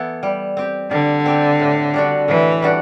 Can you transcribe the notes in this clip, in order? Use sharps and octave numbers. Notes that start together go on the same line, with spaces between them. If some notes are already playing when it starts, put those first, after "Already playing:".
Already playing: E3 B3 E4 A4
G3
C4 G4
D3 G3
C4 G4
A2
G3 D4 F#4
A2 E3
G3 D4 F#4